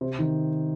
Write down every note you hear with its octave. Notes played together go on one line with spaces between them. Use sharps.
C3
D#3